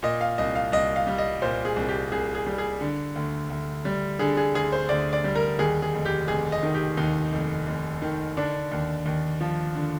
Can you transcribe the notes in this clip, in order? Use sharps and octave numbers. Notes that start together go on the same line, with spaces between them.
A#2 D#5
F5
C2 D#5
F5
C2 D#5
F5
G3
D#5
A#2 C5
G#4
C2
G4
C2 G#4
G#4
G3
G#4
D3
D2
D2
G3
D3 G#4
G#4
D2 G#4
C5
D2 D5
D5
G3
A#4
D#2 G#4
G#4
F1
G4
F1 G#4
D#5
D#3
G4
D#2 D#4
F1
F1
D#3
D3 D4
D#2
D#2
F3
D3